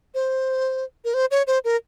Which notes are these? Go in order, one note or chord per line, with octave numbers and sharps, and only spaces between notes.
C5
A#4
C5
C#5
C5
A#4